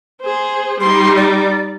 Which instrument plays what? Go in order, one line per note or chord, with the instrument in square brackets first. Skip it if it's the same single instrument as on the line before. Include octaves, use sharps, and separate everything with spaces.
[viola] G#4 C5
[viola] G3 D#4 [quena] C6
[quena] D5